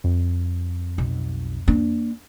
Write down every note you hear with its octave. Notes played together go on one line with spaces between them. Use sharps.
F2
B1
A#3 D4